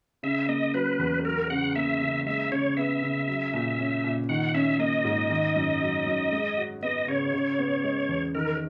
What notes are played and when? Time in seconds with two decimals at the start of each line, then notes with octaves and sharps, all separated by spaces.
0.23 C#3 E5
0.48 A#3 D#5
0.74 F#3 B4
0.99 E2
1.25 F#3 A#4
1.50 C#3 F#5
1.76 A#3 E5
2.01 C#3
2.26 G#3 E5
2.51 C#3 C#5
2.77 B3 E5
3.02 C#3
3.28 F#3
3.53 A#2
3.79 C#4
4.04 A#2
4.29 D#3 F#5
4.54 C#4 E5
4.79 A#3 D#5
5.05 G#2
5.30 D#3
5.56 F#2
5.81 F#3
6.06 F#2
6.32 G#3
6.57 F#4
6.83 B3 D#5
7.08 C#3 C#5
7.32 C#3
7.59 B3
7.84 G#3
8.09 E2
8.35 D#3 A#4